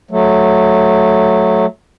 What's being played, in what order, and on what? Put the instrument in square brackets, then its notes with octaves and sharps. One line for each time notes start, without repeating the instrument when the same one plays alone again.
[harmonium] F#3 A3